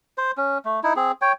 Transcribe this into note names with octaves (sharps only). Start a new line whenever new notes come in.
C5
C#4
A3
D#4 E4
C4 G#4
C#5 G5